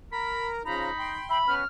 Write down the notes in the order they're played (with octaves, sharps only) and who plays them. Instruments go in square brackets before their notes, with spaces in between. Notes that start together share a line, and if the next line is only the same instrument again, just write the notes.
[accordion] A#4 [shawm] B5
[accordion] C#3 F3 A#5 [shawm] D#4 [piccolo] B5
[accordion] G5 C6
[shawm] E5 [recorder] B5
[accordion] B3 C#4 F#4 [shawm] B4 [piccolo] F6